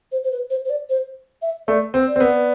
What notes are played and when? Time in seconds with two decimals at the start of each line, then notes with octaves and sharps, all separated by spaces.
0.12 C5
0.24 C5
0.32 B4
0.50 C5
0.65 C5
0.70 D5
0.90 C5
1.42 E5
1.68 A3 D5
1.94 C4
2.07 D5
2.16 C4
2.20 B3